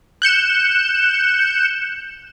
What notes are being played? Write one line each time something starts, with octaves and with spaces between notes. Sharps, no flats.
F#6 G6 C#7 E7